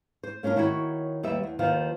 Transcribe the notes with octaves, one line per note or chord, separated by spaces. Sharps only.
C5
A#3 C#4 D4 F4 A#4
D#3 E4 F#4 C#5
D#2 G3 B3 E5
E2
D#2 D#3 F3 B3 F5